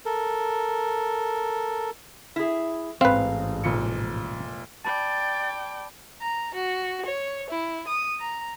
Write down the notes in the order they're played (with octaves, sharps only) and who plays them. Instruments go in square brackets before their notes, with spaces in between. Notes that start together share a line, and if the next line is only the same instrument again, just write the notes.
[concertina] A4 A#4
[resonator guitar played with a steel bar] E4 G#4
[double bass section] A1 G#2 [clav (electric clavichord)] C4 B4 [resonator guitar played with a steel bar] F5
[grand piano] F1 A#2 C#7
[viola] D5 G5 [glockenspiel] A5 B5 [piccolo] A6
[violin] A#5
F#4
C#5
E4
D#6
A#5